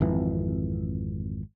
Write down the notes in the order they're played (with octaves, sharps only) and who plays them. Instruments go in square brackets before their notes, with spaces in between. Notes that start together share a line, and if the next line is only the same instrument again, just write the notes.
[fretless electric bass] G#1 F2 E3